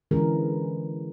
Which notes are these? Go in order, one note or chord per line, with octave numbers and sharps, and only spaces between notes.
D3 E3 G#3 C#4 G#4 A#4